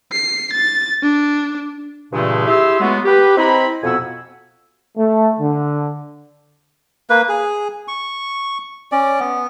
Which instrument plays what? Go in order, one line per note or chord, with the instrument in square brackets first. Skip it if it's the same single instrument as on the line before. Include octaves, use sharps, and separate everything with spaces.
[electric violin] C7
A6
D4
[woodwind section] G2 A#2 C#3 E3 G#3 A3
E4 G4 G#4 C6 E6
F#3 G#3 A3 B3
G4 B4
C4 E4 D#5 A#5 B5
F2 B2 B3 F#5 G#5 E6
[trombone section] A3
D3
[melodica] A#3 B4
G#4
C#6
C#4 D5
B3